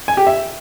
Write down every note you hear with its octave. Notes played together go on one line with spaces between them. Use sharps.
G#5
G4
E5